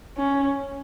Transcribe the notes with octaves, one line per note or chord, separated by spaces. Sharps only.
C#4